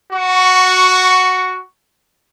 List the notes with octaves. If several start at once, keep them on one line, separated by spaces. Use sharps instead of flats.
F#4 C#6